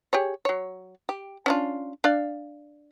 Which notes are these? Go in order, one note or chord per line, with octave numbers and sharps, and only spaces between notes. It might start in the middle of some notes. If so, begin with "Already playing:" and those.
G4 G#4 C#5
F#3 C#5
G4
C#4 D4 F4
D4 D5 F5